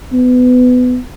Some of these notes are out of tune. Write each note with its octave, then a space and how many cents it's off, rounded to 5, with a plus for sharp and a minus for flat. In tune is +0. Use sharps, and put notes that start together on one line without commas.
B3 +20